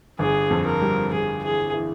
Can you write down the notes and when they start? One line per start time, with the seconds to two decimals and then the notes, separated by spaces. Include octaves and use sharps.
0.19 G1 G#4
0.50 F2
0.66 A#4
0.82 G3
1.12 F2 G#4
1.43 E3 G#4
1.74 E3